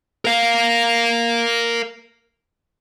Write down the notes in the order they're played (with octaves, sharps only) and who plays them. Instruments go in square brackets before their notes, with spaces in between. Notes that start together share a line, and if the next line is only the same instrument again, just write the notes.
[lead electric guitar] A#4 F5